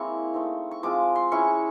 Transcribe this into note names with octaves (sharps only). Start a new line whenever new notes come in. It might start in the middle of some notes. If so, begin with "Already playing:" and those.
Already playing: G#3 A#3 C4 E4 C#6
A3 C4 D#4
C#6
F3 G#3 C4 F4 D6
C6
G#3 C#4 E4 C#6